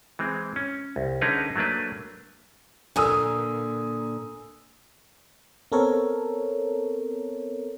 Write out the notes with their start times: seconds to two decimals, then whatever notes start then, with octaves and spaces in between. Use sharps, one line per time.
0.19 E3 G#3 C4
0.56 C#4
0.96 C2
1.21 D3 C#4 D#4 G#4 A#4 B4
1.56 F#3 A3 A#3 D4 B4
2.96 A#2 D3 G#5 D#6 E6
5.72 B3 C4 A4 A#4 C#5